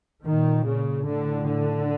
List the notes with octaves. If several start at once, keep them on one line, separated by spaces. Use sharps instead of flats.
A#2 D#3
C#3
A2 D3
D3